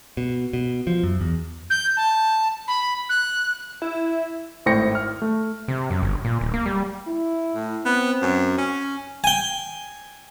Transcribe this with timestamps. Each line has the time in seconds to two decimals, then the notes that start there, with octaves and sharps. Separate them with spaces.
0.17 B2
0.53 B2
0.87 F3
1.03 F#2
1.21 E2
1.70 G6
1.97 A5
2.68 B5
3.09 F#6
3.82 E4
4.66 G#1 A2 C5 G5 A#6 C#7
4.95 F6
5.22 A3
5.68 C3
5.90 F#2
6.02 G1
6.25 A#2
6.41 D1
6.54 A#3
6.66 G3
7.08 E4
7.55 A2
7.86 B3 C4
8.22 F#2
8.58 C#4
9.24 G5 G#5